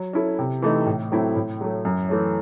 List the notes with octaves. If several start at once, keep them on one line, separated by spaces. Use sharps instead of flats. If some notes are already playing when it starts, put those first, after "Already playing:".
Already playing: F#3
C#4 E4 A4
C3
E3 A3 D#4
A2
F#3 A3 C4 E4
A2
F#3 A3
F#2
E3 A3 C#4